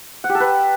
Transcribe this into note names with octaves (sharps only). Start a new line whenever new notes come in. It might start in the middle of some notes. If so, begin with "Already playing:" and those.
F#5
G4
A4
B4